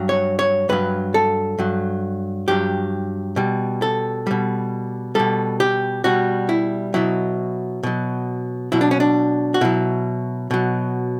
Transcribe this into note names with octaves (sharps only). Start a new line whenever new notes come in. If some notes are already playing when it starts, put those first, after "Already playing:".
Already playing: G2 F#3
C#5
C#5
G2 F#3 B4
A4
G2 F#3
G2 F#3 G4
B2 G3
A4
B2 G3
B2 G3 A4
G4
B2 G3 F#4
E4
B2 F#3 E4
B2 F#3
B2 F#3 E4
D4
C#4
D4
F#4
B2 F#3 E4
B2 F#3